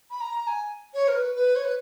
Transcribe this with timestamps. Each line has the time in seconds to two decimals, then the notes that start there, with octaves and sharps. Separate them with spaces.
0.10 B5
0.20 A#5
0.47 G#5
0.94 C#5
1.08 A#4
1.15 B4
1.35 B4
1.55 C#5
1.64 B4